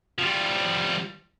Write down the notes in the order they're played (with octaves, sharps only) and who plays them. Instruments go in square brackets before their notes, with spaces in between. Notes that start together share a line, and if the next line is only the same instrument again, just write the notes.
[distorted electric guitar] F3 G3